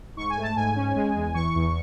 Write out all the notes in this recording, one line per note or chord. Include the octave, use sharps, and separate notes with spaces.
G#2 C#6
G#5
A3
A5
G#2 G#5
C#4
G#3
E2
E3 C#6
E2